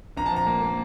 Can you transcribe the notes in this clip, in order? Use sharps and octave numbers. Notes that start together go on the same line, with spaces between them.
A#1 A#5
A5
F3 A#5
A#3
A#3